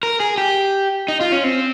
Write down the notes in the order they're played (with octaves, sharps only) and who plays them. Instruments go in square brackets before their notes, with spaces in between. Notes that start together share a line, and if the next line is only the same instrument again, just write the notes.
[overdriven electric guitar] A#4
G#4
G4
D#4
F4
C#4
C4